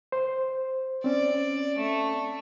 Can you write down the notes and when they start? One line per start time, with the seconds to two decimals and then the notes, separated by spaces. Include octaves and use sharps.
0.12 C5
1.04 C4 C#4 D5
1.78 A3